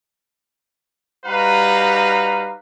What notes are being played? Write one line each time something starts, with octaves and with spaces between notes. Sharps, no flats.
G3 D#4 F#4 B4 F5 A#5